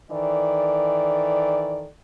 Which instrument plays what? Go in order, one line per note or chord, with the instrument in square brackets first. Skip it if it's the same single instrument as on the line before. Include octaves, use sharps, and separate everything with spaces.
[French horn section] D#3 E3 A4 D5